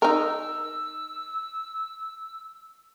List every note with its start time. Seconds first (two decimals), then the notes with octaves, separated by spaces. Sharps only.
0.02 D#4 A#4 E6